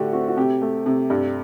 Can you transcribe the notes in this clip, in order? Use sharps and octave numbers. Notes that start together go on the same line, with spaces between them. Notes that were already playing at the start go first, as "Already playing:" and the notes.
Already playing: A2 D3 A3 F#4 G4
C4 F#4
F#4
C3 G4
A3
C3
G2